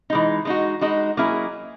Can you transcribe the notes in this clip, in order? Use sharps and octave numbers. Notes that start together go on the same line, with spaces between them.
E3 G#3 D#4
G#3 D#4 F#4
G#3 D#4 F#4
F#3 A#3 C#4 E4 G#4